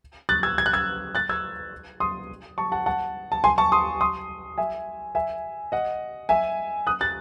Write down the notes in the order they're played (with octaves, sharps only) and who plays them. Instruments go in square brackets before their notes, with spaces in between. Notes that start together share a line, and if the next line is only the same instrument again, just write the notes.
[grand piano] F#6 A6
E6 G#6
G#6
F#6
E6 G#6
F#6 A6
E6 G#6
C6 D#6
A5 C#6
F#5 A5
F#5 A5
A5
G#5 C6
A5 C#6
C6 D#6
C6 D#6
E5 G#5
E5 G#5
D#5 F#5
E5 G#5
D#6 F#6
F#6 A6